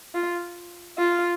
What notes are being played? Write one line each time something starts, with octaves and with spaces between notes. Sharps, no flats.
F4
F4